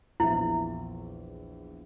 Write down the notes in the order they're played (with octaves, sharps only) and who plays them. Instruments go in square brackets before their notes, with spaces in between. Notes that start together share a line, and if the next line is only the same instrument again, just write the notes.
[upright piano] A#1 E2 E5 [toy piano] E4